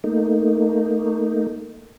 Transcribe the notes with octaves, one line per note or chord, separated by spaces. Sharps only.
A3 A#3 D#4